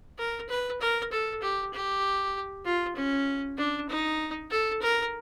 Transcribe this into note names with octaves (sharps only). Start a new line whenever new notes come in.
A#4
B4
A#4
A4
G4
G4
F4
C#4
D4
D#4
A4
A#4